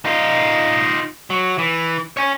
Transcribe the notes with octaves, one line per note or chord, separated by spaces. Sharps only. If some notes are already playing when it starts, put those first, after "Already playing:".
D#4 F4
F#3
E3
C#5 G#5